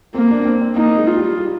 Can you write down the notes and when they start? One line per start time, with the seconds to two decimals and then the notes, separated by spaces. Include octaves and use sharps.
0.14 A#3 C4
0.31 D4
0.45 C4
0.61 C4
0.76 A#3 D#4
0.98 G#3
1.07 F4
1.17 G3
1.37 G3